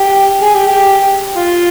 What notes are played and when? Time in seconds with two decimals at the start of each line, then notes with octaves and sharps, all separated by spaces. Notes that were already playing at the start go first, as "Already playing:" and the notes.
Already playing: G4
0.42 G#4
0.54 G4
0.67 G4
1.36 F4